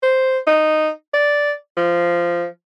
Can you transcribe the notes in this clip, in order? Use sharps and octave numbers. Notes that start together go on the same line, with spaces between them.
C5
D#4
D5
F3